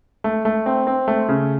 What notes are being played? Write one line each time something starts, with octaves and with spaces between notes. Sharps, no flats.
A3
A3
C4
C4
A3
C#3